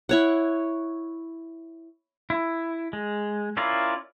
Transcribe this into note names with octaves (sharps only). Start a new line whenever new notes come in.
E4 C#5 F#5
E4
G#3
C#4 E4 F4 A#4 D5